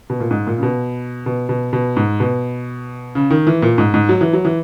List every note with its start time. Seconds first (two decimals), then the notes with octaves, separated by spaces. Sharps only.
0.10 B2
0.20 A#2
0.31 G#2
0.47 A#2
0.58 C#3
0.63 B2
1.26 B2
1.49 B2
1.73 B2
1.97 G#2
2.20 B2
3.15 C#3
3.31 D#3
3.47 E3
3.62 A#2
3.78 G#2
3.94 G#2
4.09 F#3
4.21 E3
4.33 F#3
4.45 E3